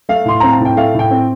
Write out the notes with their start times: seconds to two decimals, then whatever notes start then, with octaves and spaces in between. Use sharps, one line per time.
0.09 A3 F5
0.25 A2 C6
0.40 C4 A#5
0.52 A5
0.60 A2 G5
0.77 A3 F5
0.94 A2 G5
1.11 C4